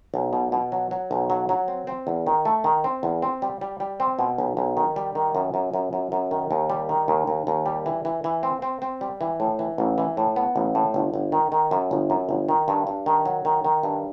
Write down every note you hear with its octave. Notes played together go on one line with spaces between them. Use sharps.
B1
B2
B2
F#3
F#3
B1
F#3
F#3
C4
C4
E2
D#3
A3
D#3
C4
E2
C4
G3
G3
G3
C4
B2
B1
B1
D#3
G3
D#3
F#2
F#2
F#2
F#2
F#2
D#3
D#2
G3
D#3
D#2
D#2
D#2
G3
E3
E3
E3
C4
C4
C4
G3
E3
A2
E3
A1
E3
A2
B3
A1
A2
G1
G1
D#3
D#3
F#2
G1
F#2
G1
D#3
G2
G2
D#3
F#3
D#3
D#3
G2